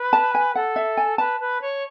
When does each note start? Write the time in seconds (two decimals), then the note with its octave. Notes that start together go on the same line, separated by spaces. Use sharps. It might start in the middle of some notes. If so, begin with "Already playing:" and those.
Already playing: B4
0.13 A5
0.35 G#5
0.55 A4 F#5
0.76 E5
0.97 G#5
1.18 B4 A5
1.40 B4
1.61 C#5